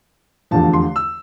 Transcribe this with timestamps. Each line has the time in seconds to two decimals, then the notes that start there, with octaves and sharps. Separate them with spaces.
0.51 F1 E2 D3 F3 A5
0.73 C6
0.96 E6